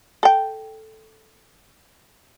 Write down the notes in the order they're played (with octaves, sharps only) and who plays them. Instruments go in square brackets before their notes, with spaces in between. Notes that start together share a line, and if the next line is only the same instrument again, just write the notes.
[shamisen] A4 G5